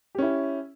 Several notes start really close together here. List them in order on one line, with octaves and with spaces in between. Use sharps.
G4 C#4 E4